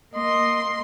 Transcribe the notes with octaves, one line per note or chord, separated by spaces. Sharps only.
A#3 D#5 C6